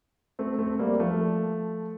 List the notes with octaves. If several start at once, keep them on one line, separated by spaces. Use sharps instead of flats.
A3 C4
A3 C4
G3 A#3
F3 A3